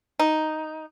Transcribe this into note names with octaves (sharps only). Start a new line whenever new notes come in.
D#4